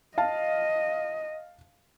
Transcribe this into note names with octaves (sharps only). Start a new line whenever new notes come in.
D#5 F5 A5